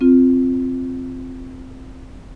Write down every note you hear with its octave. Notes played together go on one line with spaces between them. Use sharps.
C4 F4